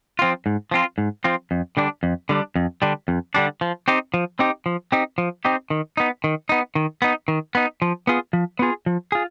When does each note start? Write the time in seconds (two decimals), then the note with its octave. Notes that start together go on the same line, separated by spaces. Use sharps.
0.19 F3 C4 F4
0.46 G#2
0.71 F3 C4 F4
0.98 G#2
1.24 F3 C4 F4
1.51 F2
1.77 D3 G3 D4
2.03 F2
2.29 D3 G3 D4
2.56 F2
2.82 D3 G3 D4
3.08 F2
3.35 D3 G3 D4
3.61 F3
3.88 C4 D#4 G4
4.14 F3
4.39 C4 D#4 G4
4.66 F3
4.92 C4 D#4 G4
5.18 F3
5.45 C4 D#4 G4
5.70 D#3
5.97 B3 D#4
6.24 D#3
6.49 B3 D#4
6.75 D#3
7.02 B3 D#4
7.28 D#3
7.55 B3 D#4
7.82 F3
8.07 B3 F4 G#4
8.33 F3
8.59 B3 F4 G#4
8.86 F3
9.12 F4 G#4